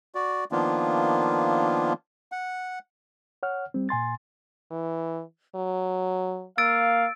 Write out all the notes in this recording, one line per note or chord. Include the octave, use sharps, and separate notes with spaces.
F#4 D5
D#3 F3 A#3 B3 D4 F4
F#5
C#5 F#5 F6
G3 C4
A#2 G#5 C6 A6
E3
F#3
A#3 F5 E6 A6 D7